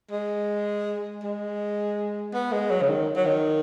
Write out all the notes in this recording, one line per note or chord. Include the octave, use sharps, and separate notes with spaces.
G#3
G#3
B3
G#3
F#3
C#3
D#3
F#3
D#3